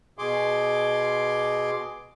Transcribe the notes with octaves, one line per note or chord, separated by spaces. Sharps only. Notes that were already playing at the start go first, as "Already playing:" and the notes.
B2 G#4 C6 D6